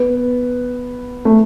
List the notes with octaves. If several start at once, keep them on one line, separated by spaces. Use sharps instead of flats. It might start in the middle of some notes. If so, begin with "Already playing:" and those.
Already playing: B3
A3